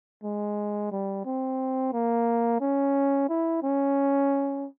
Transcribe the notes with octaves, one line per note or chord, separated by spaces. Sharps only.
G#3
G3
C4
A#3
C#4
E4
C#4